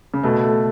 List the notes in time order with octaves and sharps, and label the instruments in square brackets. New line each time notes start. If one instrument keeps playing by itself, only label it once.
[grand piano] C#3
[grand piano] B2 [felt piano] A3
[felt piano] A3